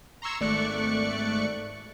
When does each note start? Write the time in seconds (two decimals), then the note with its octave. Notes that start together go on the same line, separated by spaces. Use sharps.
0.22 A#5 C6 C#6 E6 G#6
0.40 G#1 A3 D5 C#6 F#6 C#7